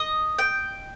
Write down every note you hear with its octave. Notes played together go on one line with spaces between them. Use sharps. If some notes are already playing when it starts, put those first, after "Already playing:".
Already playing: D#5
G5